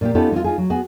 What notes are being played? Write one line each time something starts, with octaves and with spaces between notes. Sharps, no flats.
A#2 A#3 G4
B3 C#4 D#4 F4 G4 A4
G#3 C4 F4
D#4 F4 G#4
F#3
B3 F#4 G#4